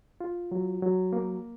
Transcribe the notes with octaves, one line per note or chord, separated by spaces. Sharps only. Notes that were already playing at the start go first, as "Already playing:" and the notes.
F4
F#3
F#3
A#3